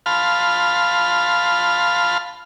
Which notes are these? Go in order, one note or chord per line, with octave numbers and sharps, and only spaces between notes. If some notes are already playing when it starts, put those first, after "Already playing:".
F5 A5 B5 C6 F6